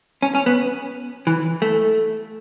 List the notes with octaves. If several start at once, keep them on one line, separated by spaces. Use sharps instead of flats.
C#4
C#4
B3
E3
A3